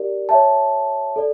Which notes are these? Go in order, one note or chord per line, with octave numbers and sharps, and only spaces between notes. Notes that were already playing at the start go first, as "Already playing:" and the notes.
Already playing: G4 A#4 D5
C#5 E5 A5
A4 D5